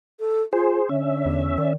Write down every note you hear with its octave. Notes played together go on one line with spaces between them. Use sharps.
A4
F4 G#4 C5
D3 C#4 E5
E2
D#3 D5